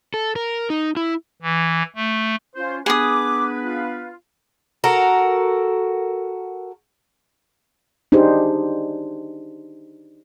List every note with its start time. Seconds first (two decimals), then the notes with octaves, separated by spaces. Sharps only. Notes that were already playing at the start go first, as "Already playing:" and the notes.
0.14 A4
0.36 A#4
0.70 D#4
0.97 E4
1.42 E3
1.96 A3
2.56 C#4 F4 C5
2.86 B3 D4 G#4 B4 B5 D6 D#6
3.61 F4
4.84 F#4 A4 A#4
8.12 D4 D#4 G4 G#4 C5